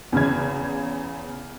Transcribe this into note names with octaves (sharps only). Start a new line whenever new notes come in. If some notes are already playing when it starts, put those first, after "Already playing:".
E2 C#3 G#6